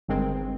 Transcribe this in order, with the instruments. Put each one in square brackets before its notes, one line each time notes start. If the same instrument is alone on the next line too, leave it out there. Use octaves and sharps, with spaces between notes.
[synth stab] G1 G2 D#3 G#3 C4